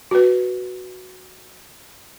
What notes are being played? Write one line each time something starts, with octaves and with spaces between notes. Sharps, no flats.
F#4 B4